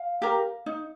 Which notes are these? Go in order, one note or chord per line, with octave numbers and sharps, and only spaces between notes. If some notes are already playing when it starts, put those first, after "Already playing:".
Already playing: F5
G4 A#4
D#4